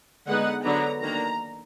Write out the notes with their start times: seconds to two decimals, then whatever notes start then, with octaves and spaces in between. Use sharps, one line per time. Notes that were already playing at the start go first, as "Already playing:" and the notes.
0.27 D3 G#3 B3 D#4 F#5
0.64 D3 F#3 B3 D4 A#5
1.02 D#3 A#3 D4 A#5